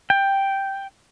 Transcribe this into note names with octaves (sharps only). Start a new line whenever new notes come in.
G5